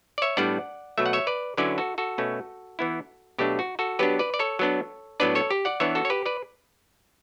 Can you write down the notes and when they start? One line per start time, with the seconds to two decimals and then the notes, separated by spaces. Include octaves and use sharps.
0.18 D5
0.22 C#5 E5
0.37 A2 G3 B3 D4 D5 F#5
0.98 B2 F#3 A3 E5
1.06 F#5
1.13 C#5 E5
1.27 B4 D5
1.57 D3 F#3 C#4 E4 B4 D5
1.78 F#4 A4
1.98 F#4 A4
2.18 B2 A3 C#4
2.79 E3 B3 E4
3.39 B2 F#3 A3 D4 G4
3.59 F#4
3.79 F#4 A4
3.99 F#3 B3 D4 G4 B4
4.19 B4 D5
4.34 D5
4.39 A4 C#5
4.59 F#3 B3 D4
5.20 A2 F#3 B3 D4 B4 D5
5.35 A4 C#5
5.51 G4
5.65 D5 F#5
5.80 E3 B3 D4 C#5 E5
5.95 F#4 A4
6.05 C#5
6.10 G4 B4
6.26 B4 D5